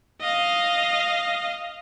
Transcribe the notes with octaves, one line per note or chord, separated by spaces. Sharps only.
D#5 F5